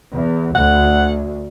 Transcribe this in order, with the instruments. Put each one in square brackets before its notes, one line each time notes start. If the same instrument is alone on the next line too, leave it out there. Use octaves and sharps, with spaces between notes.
[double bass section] E2
[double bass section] D2 [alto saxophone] F#5